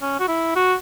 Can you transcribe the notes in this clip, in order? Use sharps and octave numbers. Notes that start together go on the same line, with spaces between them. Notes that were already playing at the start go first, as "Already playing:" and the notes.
C#4
F#4
E4
F#4